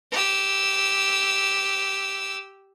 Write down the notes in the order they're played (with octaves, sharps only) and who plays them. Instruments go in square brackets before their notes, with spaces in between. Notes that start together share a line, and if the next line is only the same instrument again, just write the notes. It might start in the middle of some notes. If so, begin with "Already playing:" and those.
[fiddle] G4 E6